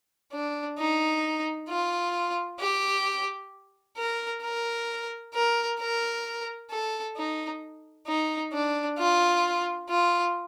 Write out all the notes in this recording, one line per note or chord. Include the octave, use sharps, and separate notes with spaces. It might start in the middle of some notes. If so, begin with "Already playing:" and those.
D4
D#4
F4
G4
A#4
A#4
A#4
A#4
A4
D#4
D#4
D4
F4
F4